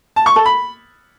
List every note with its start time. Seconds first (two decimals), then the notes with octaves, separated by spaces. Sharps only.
0.16 A5
0.26 C#6
0.36 A4
0.46 B5